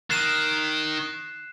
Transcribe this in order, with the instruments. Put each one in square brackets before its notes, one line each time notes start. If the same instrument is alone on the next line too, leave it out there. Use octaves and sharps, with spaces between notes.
[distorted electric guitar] D#3 [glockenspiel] F#6 C7 E7